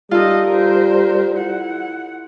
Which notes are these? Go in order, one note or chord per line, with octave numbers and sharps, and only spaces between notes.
G3 D#4 F4 A4 D#5
A#4 C5
E4 F#5